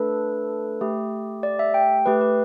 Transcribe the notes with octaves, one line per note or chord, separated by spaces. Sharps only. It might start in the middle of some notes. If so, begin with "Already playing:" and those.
Already playing: A3 D4 A4 B4
A3 G4
D5
E5
G5
A3 G4 B4
B4